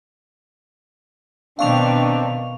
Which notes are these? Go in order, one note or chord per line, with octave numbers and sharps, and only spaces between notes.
B2 D#3 C4 D4 F5 C#6 F7